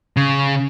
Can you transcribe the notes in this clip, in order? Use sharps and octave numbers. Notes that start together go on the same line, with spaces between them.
C#3